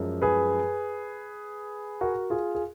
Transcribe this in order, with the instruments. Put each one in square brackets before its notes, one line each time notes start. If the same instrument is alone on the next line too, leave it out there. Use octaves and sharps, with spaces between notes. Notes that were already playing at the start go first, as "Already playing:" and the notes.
Already playing: [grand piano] F#2 F3 G#3
G#4 B4
F#4 A#4
F4 G#4
G#4